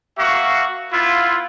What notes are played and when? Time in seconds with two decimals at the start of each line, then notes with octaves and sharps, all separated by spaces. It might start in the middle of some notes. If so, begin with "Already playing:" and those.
0.17 A#3 F#4 E5 F5 C#6
0.93 B3 E4 F4